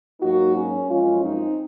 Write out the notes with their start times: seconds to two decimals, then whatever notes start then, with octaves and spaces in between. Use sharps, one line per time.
0.21 G#2 F#3 A#3 D#4 F#4
0.55 C#4
0.88 F#2 F3 G#3 C#4 F4
1.22 C4 D#4